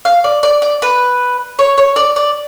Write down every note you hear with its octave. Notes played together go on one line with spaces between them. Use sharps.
F5
D5
D5
D5
B4
C#5
C#5
D5
D5